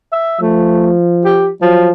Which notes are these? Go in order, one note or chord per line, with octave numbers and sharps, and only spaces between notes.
E5
F3 A3
G4
F3 F#3